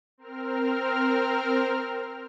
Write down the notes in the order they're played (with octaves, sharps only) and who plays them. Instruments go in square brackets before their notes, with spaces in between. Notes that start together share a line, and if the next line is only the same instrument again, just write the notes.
[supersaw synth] C4 A#4 F6